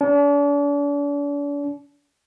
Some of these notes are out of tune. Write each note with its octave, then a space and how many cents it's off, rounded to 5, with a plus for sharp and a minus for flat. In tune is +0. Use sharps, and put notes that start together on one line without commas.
D4 -40